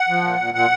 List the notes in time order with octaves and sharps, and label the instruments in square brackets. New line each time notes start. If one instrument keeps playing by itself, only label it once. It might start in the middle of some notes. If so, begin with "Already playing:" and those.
Already playing: [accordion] F#5
F3
A#2
A#2
A#2 F#5